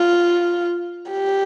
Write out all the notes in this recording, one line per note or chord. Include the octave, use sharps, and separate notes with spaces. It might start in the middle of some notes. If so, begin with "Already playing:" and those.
Already playing: F4
G4